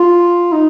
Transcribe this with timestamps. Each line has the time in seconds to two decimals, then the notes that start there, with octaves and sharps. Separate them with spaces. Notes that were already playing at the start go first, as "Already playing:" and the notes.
Already playing: F4
0.52 D#4